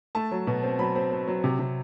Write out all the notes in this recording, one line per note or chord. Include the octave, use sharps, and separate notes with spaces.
A3 A5
F#3
B2
C4
F#3 B5
C4
C4
F#3
C3
C3